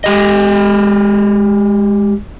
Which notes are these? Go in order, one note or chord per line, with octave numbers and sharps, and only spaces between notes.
G#3 G4 D#5